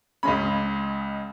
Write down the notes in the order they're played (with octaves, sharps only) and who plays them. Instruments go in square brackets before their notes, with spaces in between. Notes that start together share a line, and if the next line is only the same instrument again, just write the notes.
[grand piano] C#2 C#3 G#3 C#4 B5